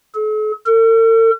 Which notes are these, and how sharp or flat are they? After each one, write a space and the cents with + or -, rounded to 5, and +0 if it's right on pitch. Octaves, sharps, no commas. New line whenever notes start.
A4 -45
A4 +45